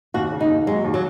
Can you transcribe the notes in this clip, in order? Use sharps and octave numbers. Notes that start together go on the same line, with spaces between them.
D#2 F#4
C#3
D#4
D#2
F#3 G#3
D#2
F#3